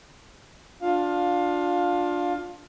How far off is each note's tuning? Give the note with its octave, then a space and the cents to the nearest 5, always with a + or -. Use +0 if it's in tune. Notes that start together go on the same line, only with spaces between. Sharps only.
D4 +0 F4 +20 F5 +15